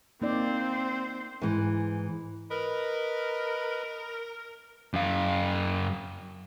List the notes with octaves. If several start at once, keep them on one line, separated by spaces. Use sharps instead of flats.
A#3 C4 D#4 C5 D5
G#2 E3
A#4 B4 D#5 B5
F#2 F5